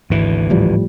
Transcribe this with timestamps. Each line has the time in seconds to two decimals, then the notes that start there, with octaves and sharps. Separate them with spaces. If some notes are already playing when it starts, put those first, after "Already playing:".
0.10 G#1 D2 E3
0.50 A2 F3 G3